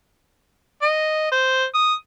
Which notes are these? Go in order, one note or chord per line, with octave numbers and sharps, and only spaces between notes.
D#5
C5
D#6